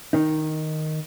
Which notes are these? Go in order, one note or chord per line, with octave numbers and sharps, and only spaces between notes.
D#3 D#4